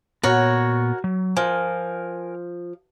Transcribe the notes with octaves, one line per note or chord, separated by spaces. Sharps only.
A#2 B3 F#4 A#4 C#5
F#3
F3 A#4 G#5